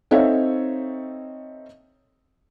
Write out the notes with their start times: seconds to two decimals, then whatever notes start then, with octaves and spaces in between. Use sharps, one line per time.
0.11 C4 D#4 A4 C#5 E5 F5